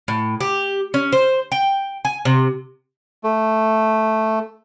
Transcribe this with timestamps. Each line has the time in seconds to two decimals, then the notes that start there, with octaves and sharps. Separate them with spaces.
0.08 A2
0.41 G4
0.94 C#4
1.12 C5
1.52 G5
2.05 G#5
2.25 C3
3.24 A3